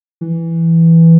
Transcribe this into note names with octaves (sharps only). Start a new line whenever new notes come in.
E3